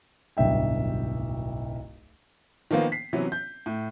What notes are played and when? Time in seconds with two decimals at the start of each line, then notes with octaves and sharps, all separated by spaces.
0.37 D1 B1 G2 E5 G5
2.71 D#3 F3 A#3 B3 F4
2.92 B6 C7
3.13 C3 E3 F#3 B3 C#4
3.32 G6
3.66 A2